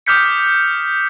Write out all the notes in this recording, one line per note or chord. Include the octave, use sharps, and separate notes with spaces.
D6 D#6 F6 G6 B6 C#7